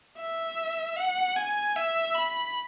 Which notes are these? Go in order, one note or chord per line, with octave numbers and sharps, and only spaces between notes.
E5
F#5
G#5
E5
B5